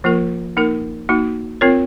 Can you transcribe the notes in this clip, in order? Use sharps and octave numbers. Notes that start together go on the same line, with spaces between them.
F3 A#3 F4 A#4
A#3 D#4 A#4
A#3 D#4 F#4
C4 F4 A#4 C#5